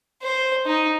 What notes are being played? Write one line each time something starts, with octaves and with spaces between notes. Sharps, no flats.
C5
D#4